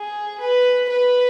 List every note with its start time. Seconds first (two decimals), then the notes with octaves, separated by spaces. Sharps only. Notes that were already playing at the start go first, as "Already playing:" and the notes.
Already playing: G#4
0.41 B4
0.89 B4